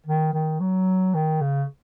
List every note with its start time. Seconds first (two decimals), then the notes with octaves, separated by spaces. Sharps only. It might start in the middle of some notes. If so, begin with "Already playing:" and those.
0.07 D#3
0.33 D#3
0.60 F#3
1.14 D#3
1.41 C#3